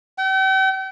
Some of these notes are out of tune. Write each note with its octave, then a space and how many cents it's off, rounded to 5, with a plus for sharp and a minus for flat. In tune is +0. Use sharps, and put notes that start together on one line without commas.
G5 -40